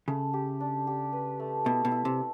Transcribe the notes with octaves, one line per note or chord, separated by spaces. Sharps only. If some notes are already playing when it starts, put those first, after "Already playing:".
C#3 A3
G4
D4
G4
B4
A3
B2 E4
B2
E4
C3